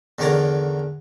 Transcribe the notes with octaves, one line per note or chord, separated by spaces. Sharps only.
E2 D3 D#3 C#5 D5 A#5